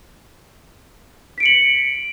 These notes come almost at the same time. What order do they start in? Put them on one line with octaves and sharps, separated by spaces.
B6 D7 C#7 F#7